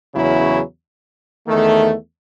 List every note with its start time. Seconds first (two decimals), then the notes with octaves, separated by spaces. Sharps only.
0.15 E2 C#3 F#3 C#4 E4
1.47 E2 D#3 A3